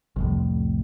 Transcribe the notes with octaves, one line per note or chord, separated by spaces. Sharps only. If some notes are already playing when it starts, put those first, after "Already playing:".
C2 F2 A2